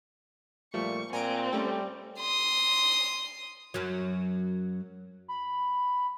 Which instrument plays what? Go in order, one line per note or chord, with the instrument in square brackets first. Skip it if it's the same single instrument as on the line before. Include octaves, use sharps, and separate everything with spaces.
[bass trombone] A#2 [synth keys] F3 G3 A3 [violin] C#6
[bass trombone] A#2 [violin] C4 [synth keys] G#5 A#5 D7
[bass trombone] G3 [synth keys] A3 C#4 A4
[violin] C6 D#6
[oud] F#2 F#3
[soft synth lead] B5